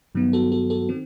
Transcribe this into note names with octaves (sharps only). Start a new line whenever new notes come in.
G2 D#3 F#3 B3
F#4 A4
F#4 A4
F#4 A4
D#3 C4